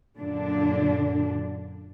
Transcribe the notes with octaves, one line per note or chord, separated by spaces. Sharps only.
F#2 A#2 D3 D4